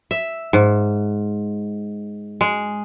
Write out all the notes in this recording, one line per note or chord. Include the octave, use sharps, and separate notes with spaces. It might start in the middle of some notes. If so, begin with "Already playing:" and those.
E5
G#2
G#3